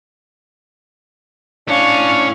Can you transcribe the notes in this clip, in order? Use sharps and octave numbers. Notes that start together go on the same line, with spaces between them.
A2 C#4 D4 C#5 F5 C#6